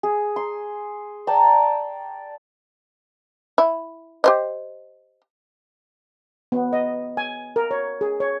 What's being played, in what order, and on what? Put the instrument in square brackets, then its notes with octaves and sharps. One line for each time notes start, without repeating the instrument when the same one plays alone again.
[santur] G#4
C6
D5 G5 A5 A#5
[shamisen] E4
G4 C5 D#5
[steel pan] B3
D#5
G#5
A#4
C#5
G#4
C#5